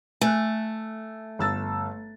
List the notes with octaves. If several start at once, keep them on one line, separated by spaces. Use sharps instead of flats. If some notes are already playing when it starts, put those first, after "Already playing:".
A3 G#5 F#6
G1 E6 A6